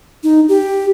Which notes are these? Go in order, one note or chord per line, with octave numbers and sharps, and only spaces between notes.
D#4
G4